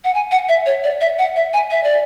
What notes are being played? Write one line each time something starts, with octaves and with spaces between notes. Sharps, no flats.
F#5
G#5
F#5
E5
C#5
D5
E5
F#5
E5
G#5
E5
D5